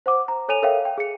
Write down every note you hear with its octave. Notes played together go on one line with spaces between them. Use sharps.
C5 F#5 D6
A#5
A4 C#5 G#5 D#7 F7
A4 A#4 C#5 E5 F5 G5
G5
G#4 C#7